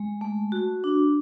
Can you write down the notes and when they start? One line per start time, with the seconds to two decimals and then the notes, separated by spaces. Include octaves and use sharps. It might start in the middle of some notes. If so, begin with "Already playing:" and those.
Already playing: G#3
0.21 A3
0.52 F#4
0.84 D4